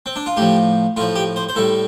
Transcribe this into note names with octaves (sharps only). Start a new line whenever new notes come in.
C4
D4
F4
A2 F3 G4
A2 F3 F4
G4
C5
C5
A2 G3 A4